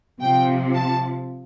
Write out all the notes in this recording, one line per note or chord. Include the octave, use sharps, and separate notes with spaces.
C3 F3 G5
A5